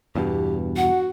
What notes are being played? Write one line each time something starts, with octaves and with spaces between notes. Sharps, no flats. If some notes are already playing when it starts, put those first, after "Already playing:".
E2 G2 B2 G4
F#4 F#5